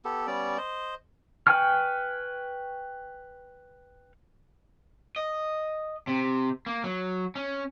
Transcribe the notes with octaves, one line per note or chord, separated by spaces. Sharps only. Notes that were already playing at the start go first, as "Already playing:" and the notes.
B3 G4 A4
G3 B3 C#4 D5
C5 D#5
B4 G5 G#5 C#6 F6
D#5
C3
A#3
F#3
C#4